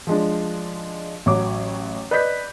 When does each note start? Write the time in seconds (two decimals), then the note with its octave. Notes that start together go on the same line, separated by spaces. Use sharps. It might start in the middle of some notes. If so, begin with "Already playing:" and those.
0.07 F3 G#3 D4
1.26 A1 F#3 C#5 D6
2.11 B4 D5 D#5 F#6 G6 B6